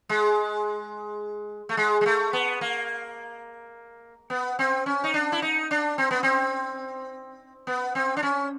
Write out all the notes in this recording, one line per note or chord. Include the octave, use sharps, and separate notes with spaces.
G#3
A3
G#3
G#3
A3
B3
A#3
B3
C4
C#4
D#4
D4
E4
D#4
D4
C4
B3
C4
B3
C4
D4
C#4